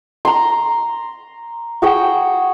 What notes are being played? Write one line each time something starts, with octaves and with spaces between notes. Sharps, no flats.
A#5 C6
F#4 G#4 F#5 G5